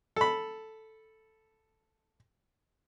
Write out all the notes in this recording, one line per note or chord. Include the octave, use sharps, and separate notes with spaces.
A4 B5